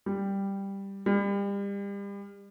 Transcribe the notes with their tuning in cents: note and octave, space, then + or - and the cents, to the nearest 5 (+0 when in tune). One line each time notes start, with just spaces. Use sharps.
G3 +5
G3 +35